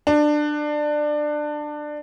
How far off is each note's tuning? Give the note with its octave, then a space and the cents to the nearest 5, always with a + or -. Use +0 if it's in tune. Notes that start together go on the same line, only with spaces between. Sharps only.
D4 +20